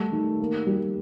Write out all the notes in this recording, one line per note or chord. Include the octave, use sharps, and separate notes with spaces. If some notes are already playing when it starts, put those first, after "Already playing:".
Already playing: G3 A3
D#3
A#3
G3